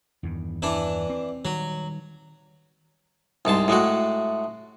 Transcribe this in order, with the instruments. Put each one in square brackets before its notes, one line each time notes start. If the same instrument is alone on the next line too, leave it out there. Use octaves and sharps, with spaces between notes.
[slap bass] E2 G2 D#3
[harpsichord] E3 D4
[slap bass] C4
[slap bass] D#3 G3 [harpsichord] F#3
[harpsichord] C2 G#2 A5 C6
A2 G#3 A3 F#4